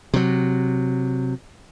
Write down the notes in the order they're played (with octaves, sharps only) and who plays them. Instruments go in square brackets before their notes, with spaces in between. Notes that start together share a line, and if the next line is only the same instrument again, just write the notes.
[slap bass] C3 F#3